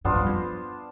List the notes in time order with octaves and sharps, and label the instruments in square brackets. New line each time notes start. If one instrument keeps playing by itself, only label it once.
[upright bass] G2 [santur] B3 D4 F4 C5
[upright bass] G2
F2